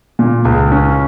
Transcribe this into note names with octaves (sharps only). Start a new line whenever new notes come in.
A#2
C#2
C#4